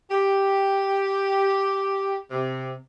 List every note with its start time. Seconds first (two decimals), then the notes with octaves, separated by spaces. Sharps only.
0.10 G4
2.31 C3